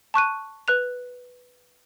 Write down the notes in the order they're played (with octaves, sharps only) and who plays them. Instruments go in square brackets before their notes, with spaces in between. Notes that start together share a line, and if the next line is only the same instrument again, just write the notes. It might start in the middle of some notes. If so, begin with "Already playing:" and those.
[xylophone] A5 C#6 F#6 D#7
B4 F#6 F7